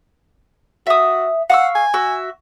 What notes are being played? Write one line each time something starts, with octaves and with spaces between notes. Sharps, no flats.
F#4 E5 D#6
F5 F#5 C#6 E6
G#5
F#4 E5